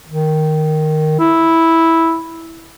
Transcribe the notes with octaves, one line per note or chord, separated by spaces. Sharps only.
D#3
E4